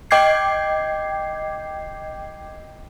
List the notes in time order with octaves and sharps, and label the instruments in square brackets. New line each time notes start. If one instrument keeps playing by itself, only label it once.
[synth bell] D#5 G5 D6 G6 G#6 C7